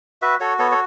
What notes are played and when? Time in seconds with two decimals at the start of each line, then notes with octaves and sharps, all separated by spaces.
0.22 F#4 B4 E5
0.40 F#4 A4 C#5
0.59 B3 A4 C#5
0.71 A4 C#5